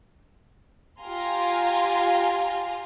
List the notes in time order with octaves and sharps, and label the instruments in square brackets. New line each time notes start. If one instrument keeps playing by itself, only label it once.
[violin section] F4 G4 F5 G#5 A#5 C6